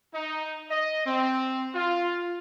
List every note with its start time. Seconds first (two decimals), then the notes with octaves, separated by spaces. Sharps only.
0.13 D#4
0.70 D#5
1.06 C4
1.74 F4